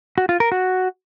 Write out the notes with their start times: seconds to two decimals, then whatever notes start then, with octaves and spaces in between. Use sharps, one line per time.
0.18 F#4
0.29 F4
0.40 A#4
0.52 F#4